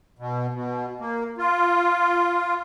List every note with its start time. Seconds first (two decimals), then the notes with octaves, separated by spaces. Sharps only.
0.19 B2
0.54 B2
1.00 A#3
1.38 F4